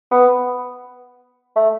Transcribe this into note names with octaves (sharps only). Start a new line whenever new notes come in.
B3
A3